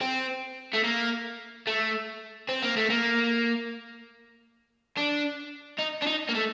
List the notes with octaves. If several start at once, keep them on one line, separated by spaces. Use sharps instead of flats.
C4
A3
A#3
A3
C4
A#3
A3
A#3
D4
D#4
D4
D#4
A#3
A3